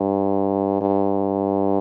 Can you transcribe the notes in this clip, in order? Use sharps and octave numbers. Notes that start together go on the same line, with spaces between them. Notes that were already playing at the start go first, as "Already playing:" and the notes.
Already playing: G2
G2